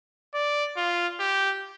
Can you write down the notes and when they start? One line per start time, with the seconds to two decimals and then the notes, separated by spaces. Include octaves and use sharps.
0.34 D5
0.77 F4
1.20 G4